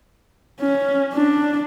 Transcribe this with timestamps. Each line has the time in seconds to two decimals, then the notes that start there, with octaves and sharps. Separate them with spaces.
0.60 C#4
1.14 D4